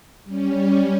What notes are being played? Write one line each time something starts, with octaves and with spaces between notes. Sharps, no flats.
G3 C#4